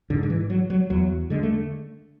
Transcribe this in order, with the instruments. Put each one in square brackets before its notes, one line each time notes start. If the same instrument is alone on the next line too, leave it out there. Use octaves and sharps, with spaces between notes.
[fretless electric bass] G#2 D3
D3
E3
F#3
F#3
E2 F#3
D3 G#3
A3